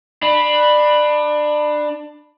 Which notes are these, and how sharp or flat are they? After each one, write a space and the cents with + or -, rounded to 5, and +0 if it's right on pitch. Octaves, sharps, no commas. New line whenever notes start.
D4 +25 B5 -5